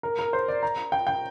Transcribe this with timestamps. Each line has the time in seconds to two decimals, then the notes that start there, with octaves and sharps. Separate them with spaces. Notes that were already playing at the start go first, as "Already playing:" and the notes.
0.03 A#4
0.19 A#4
0.33 C5
0.48 D5
0.63 A#5
0.92 G5
1.07 G5